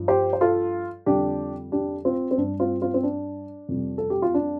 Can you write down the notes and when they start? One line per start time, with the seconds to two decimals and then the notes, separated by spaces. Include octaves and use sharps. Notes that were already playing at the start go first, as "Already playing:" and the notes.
Already playing: G2 F3
0.08 G4 C5
0.33 C5
0.41 F4 A4
1.06 F2 D3 G3 D4 G4
1.72 D4 G4
2.05 C4 F4
2.31 C4
2.38 G2 G3 D4
2.60 C4 F4
2.82 C4 F4
2.94 C4
3.03 D4
3.69 F2 C3 G3
3.98 A4
4.10 G4
4.22 F4
4.34 D4